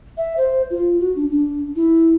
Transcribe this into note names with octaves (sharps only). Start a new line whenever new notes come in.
E5
C5
F4
F#4
D4
D4
E4